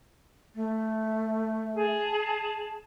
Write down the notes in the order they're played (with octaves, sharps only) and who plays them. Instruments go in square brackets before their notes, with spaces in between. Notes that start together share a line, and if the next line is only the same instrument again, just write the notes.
[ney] A3
[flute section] G#4 A5